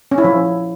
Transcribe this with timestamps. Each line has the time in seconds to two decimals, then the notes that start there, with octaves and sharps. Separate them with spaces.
0.11 C#4
0.18 E4
0.24 F3